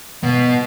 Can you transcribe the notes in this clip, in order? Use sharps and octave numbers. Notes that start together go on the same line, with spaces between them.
B2